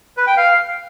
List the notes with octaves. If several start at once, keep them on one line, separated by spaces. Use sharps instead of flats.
B4
G5
F5